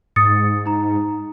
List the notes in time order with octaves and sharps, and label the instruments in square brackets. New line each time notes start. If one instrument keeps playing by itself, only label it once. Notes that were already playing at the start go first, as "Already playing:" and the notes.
[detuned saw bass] G#2 [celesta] D#6 A6 C#7
[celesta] D#4 A#5